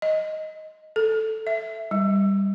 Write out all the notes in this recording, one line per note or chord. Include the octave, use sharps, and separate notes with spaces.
D#5
A4
E5
G3